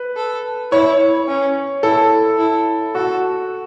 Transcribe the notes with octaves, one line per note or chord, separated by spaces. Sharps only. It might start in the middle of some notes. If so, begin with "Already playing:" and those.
Already playing: B4
A4
E4 C#5
C#4
E4 A4
E4
F#4 A4